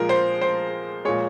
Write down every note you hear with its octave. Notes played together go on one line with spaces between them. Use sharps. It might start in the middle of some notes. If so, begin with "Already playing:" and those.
Already playing: A#2 F3 G#3 A#4
C5
C5
A#2 F3 G#3 C#5